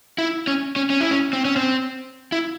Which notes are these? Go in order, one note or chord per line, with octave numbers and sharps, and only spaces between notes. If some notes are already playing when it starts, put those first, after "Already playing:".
E4
C#4
C#4
C#4
E4
C#4
C4
C#4
C4
E4